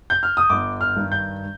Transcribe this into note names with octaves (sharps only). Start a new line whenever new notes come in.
G6
F6
D#6
G1 D6
F6
G2 D#3
G6